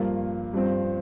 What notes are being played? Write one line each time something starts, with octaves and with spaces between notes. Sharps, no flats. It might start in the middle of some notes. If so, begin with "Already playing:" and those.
Already playing: G2 F3 A#3 F4
G2 F3 C4